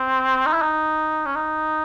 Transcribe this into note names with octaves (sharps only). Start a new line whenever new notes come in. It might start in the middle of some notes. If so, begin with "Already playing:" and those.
Already playing: C4
D#4
E4
D#4
C#4
D#4